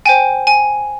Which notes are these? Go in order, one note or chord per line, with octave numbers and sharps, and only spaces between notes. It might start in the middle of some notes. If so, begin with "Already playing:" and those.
C5 G5 G#5
G#5